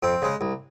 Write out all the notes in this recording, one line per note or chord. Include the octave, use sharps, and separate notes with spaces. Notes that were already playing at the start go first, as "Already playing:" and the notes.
F2 C4
C#3 G#3
C2